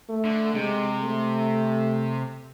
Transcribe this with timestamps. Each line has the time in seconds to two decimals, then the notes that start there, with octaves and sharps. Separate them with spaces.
0.09 A3
0.25 D3
0.55 C3 G#3
1.02 A3